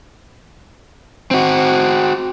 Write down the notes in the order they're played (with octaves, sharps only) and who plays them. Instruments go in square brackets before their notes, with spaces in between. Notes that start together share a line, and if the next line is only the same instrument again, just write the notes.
[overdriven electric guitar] C4 F#4